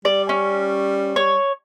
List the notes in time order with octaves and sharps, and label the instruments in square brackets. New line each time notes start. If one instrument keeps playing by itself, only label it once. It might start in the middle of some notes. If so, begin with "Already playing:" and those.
[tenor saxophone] G3 [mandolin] D5
[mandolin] C#4
C#5